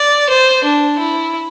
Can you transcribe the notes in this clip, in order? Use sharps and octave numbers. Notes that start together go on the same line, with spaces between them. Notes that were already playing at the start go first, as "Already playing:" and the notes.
Already playing: D5
C5
D4
E4